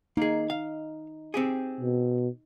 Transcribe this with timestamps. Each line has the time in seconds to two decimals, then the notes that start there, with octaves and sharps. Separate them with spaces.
0.17 A#3 D#4 G#4
0.50 F5
1.34 C4 G4 G#4
1.80 B2